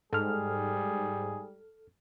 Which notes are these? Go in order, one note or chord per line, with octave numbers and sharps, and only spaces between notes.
G#2 G3 G#4 A4 F6